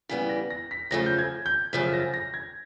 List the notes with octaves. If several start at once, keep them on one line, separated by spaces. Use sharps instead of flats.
C#3 E3 G3 B3 B6
A#6
A#6
B6
F#2 C#3 F3 A3 A#6
G6
G#6
G6
F#2 C#3 F3 A3 B6
A#6
A#6
G#6